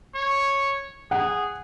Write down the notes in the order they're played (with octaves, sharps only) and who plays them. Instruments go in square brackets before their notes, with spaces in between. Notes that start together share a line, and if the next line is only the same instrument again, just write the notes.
[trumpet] C#5
[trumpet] G#4 [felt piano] F#5